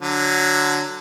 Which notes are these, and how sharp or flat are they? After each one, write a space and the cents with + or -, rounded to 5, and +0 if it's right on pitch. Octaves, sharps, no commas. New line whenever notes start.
D3 +0 F#3 -5